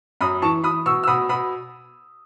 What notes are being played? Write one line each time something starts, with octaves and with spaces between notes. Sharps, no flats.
F#2 B5 D#6
E3 A5 C#6
E3 B5 D#6
B2 C#6 E6
E6
B2 B5 D#6
B2 B5 D#6